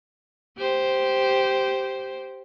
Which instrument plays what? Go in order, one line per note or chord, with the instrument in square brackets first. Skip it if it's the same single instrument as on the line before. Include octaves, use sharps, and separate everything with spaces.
[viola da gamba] G4 C5